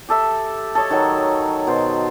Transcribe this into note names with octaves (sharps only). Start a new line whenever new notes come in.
G4 A4 E5
A4 C#5 D#5
D#3 F#3
B2 C5